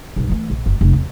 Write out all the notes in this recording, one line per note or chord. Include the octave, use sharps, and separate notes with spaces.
B1 G2
E3 A3
A#1
F#1
F1
E2